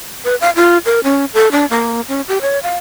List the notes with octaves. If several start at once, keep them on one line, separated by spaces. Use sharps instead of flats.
B4
F5
F4
A#4
C#4
A4
D4
A#3
C#4
G4
C#5
F5